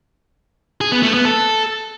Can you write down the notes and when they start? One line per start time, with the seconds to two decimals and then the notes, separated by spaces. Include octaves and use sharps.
0.81 G#4
0.92 B3
1.03 A3
1.14 B3
1.25 A4